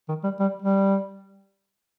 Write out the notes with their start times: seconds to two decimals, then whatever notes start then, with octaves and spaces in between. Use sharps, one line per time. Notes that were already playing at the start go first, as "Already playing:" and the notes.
0.09 D#3
0.24 G3
0.40 G3
0.62 G3